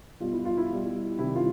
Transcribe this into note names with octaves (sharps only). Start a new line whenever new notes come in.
B2 G3 F4
E4
F4
E4
B2 G3
C3 D#3 G3 E4
F4